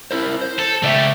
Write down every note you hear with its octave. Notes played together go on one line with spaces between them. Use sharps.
E4 A#4 C5
C5
A4
C#3 A3 G4 D5 E5